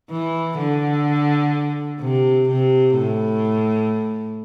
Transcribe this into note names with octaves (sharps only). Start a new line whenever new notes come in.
E3
D3
C3
C3
A2